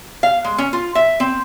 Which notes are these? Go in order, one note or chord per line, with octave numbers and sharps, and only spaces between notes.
F5
G#3
C#4
F4
E5
C4